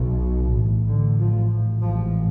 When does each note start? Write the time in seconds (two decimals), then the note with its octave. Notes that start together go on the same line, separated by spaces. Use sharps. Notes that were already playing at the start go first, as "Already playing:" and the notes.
Already playing: B1 B2
0.55 A1 A2
0.87 D3
1.19 F3
1.81 A1 G#2 F3